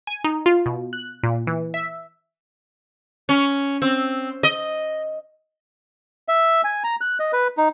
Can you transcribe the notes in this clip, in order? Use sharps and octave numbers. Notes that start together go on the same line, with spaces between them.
G#5
D#4
F4
B2
F#6
A#2
E3
E5
C#4
C4
D#5
E5
G#5
A#5
F#6
D#5
B4
D#4